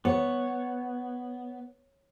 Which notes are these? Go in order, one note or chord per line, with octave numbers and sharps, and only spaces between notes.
B3 C#5